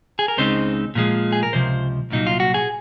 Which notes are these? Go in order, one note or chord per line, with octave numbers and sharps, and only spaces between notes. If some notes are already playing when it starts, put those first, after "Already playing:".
G#4
A#4
C#2 C#3 G#3 C4 D#4 C5
A#2 F3 G#3
G#4
A#4
C#2 C3 F3 C5
C2 A#2 F#3 D#4
F4
F#4
G#4